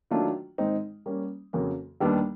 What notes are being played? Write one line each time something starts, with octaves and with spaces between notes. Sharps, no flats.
D#3 F#3 A3 D4 F4
G#2 D#3 G#3 C4 D#4
G3 A#3 C#4
F2 C#3 F#3 A#3
D#2 D#3 G3 B3 D4